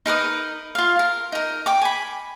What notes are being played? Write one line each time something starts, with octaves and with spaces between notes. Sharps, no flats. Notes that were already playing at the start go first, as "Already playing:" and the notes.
D#4 A#4 B4 D#6
F4 F5
A#4
D#4 A#4
G5 D6
G#5 B5